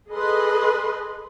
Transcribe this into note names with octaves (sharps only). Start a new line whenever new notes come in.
G#4 A4 B4 D#5 C6